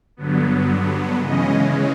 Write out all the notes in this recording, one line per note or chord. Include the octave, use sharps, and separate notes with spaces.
G2 D3 F#3 B3
C#3 E3 G#3 C#4 D#5